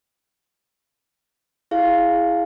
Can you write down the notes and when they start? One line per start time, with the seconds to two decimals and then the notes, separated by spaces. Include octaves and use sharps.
1.71 E4 G#4 F5